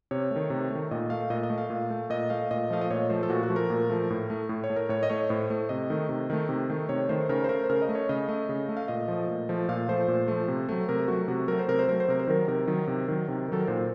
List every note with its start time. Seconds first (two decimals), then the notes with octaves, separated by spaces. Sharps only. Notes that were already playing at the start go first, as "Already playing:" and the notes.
0.11 C3 C#5
0.31 D#3 A3
0.50 C3
0.70 D#3 A3
0.91 A#2 D#5
1.10 A3 F5
1.30 A#2 D#5
1.43 D#5
1.50 A3
1.58 F5
1.70 A#2
1.90 A3
2.10 A#2 D#5
2.30 A3 F5
2.51 A#2 D#5
2.70 F3 A3 F5
2.81 D#5
2.90 A#2 C#5
3.09 F3 A3 C5
3.23 A4
3.29 A#2 F#4
3.43 F#4
3.50 F3 A3
3.56 A#4
3.70 A#2
3.90 F3 A3
4.10 A2
4.30 A3
4.49 A2
4.64 C#5
4.70 A3
4.76 A#4
4.89 A2 C#5
5.03 D#5
5.10 A3 C#5
5.29 A2 C5
5.50 A3
5.69 C3 D#5
5.90 D#3 A3
6.09 C3
6.30 D#3 A3
6.49 C3
6.69 D#3 A3
6.89 C3 C#5
7.09 D#3 A3 C5
7.29 C#3 A#4
7.44 C5
7.49 A3 A#4
7.64 C5
7.70 C#3 A#4
7.82 D#5
7.89 A3
7.95 C#5
8.09 C#3 D#5
8.29 A3
8.49 C#3
8.69 A3
8.77 F5
8.88 A#2 D#5
9.08 F3 A3
9.28 A#2
9.49 F3 A3
9.69 A#2 F5
9.88 F3 A3 C5
10.08 A#2
10.28 F3 A3
10.48 C3
10.69 F#3 A3
10.89 C3 A#4
11.08 F#3 A3 F#4
11.28 C3 F#4
11.48 F#3 A3 A#4
11.59 C5
11.68 C3 A#4
11.79 C5
11.88 F#3 A3 A#4
12.00 C5
12.08 C3 A#4
12.19 C5
12.27 D#3 F#3 A#4
12.48 C3 A#4
12.67 D#3 F#3
12.87 C3
13.08 D#3 F#3
13.28 C3
13.48 D#3 F#3 A4
13.59 A#4
13.67 A#2 C5